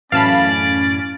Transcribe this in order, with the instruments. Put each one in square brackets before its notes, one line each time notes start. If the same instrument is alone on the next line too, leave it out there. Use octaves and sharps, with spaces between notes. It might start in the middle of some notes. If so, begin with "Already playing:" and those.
[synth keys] F#2 A2 E3 [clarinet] C#4 [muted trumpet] D5 [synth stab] F5 A5 B5